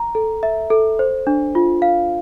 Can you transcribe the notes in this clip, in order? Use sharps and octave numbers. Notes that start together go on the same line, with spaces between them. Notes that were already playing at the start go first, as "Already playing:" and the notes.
Already playing: A#5
A4
E5
A4
C5
D4
F4
F5